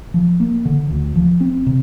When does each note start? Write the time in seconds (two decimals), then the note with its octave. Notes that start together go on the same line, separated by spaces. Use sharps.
0.14 F3
0.40 A#3
0.65 D3
0.90 D2
1.16 F3
1.41 C4
1.67 C3